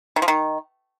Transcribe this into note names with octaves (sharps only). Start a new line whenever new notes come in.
D#3
F3
D#3